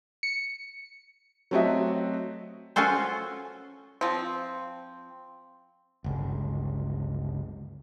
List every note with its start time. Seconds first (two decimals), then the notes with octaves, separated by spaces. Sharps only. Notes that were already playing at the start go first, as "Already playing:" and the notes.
0.23 C#7
1.51 F#3 A3 C4 F#4 D#5 E5
2.76 C#4 F4 F#4 A4 C5
4.01 F3 C4
6.04 G1 C#2